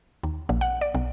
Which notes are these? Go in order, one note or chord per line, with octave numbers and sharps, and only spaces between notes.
D#2
A#1
F#5
D5
B1